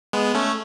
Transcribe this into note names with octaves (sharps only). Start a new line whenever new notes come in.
G#3 B3
A3 C#4